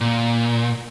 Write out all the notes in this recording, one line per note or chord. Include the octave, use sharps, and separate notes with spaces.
A#2